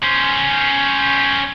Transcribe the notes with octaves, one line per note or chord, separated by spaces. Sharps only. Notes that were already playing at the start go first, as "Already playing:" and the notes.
C#4 C5